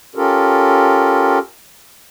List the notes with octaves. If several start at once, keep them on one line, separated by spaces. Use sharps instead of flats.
C#4 F4 G4 A4 A#4